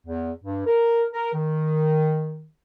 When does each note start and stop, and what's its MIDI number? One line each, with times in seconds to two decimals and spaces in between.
0.07 0.32 40
0.44 0.64 43
0.66 1.04 70
1.13 1.32 70
1.34 2.47 51